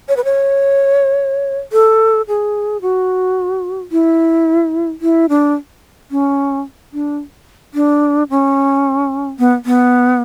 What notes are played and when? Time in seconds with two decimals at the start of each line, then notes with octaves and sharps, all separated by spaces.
0.09 C#5
0.17 B4
0.25 C#5
1.73 A4
2.28 G#4
2.82 F#4
3.92 E4
5.01 E4
5.29 D4
6.11 C#4
6.93 D4
7.74 D4
8.30 C#4
9.39 B3
9.65 B3